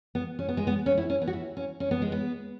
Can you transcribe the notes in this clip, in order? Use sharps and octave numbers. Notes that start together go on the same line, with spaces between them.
B3
C#4
B3
G#3
B3
C#4
E4
C#4
B3
F#4
E4
C#4
C#4
B3
G#3
B3